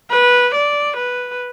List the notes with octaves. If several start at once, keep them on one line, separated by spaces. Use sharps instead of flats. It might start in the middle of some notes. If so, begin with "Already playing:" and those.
B4
D5
B4